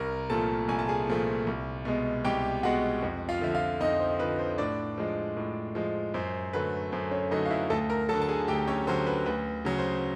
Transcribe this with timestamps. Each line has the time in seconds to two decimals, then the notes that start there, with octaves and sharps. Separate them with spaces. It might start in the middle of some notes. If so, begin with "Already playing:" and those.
Already playing: C2 A#4 A#5
0.30 A#2 F3 A3 A4 A5
0.68 C2 G#5
0.79 A5
0.89 G#4 G#5
1.08 A#2 F3 A3
1.47 C2
1.85 B2 G#3
2.24 C2 G4 G5
2.63 B2 G#3 F#4 F#5
3.02 F2
3.29 F4 F5
3.41 D3 F3 E5
3.55 F4 F5
3.80 F2 D#4 D#5
4.00 C5
4.19 D3 F3 B4
4.39 C5
4.58 A2 D4 D5
4.98 F3 G#3
5.37 A2
5.75 F3 G#3
6.14 F#2 C5
6.53 D3 F#3 A3 B4
6.92 F#2 C5
7.11 C#4 C#5
7.31 D3 F#3 A3 D#4 D#5
7.45 F5
7.51 E4 E5
7.70 D2 A4 A5
7.90 A#4 A#5
8.09 F#3 A4 A5
8.14 D3
8.22 A5
8.29 G#4 G#5
8.48 D2 G4 G5
8.68 C#4 C#5
8.87 D3 F#3 C5
9.06 B4
9.26 D2 B4
9.65 C#3 F#3
9.78 C5